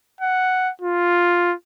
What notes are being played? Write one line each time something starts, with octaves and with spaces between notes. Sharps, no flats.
F#5
F4